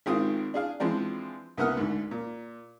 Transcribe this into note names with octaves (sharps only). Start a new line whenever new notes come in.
G#1 D#3 G#3 C4 F4 D#6
D4 G#4 F5
E3 F3 G#3 C4 D4
C2 A#3 B3 F#5 D#6 F6
D2 G#2
A#2